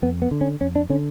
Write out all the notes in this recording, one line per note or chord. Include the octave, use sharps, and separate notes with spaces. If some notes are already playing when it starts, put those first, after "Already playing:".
F2 B3
B3
D3
C#4
F2 C#4
D4
D3 C#4